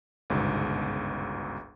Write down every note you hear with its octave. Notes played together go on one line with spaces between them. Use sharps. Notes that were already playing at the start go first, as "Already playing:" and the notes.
G1 C#2 G#2 B2